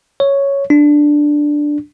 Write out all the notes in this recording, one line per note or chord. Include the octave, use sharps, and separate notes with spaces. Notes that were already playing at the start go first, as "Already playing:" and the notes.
C#5
D4